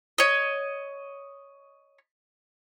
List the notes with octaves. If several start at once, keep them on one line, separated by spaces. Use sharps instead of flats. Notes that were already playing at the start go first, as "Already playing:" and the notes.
C#5 D#5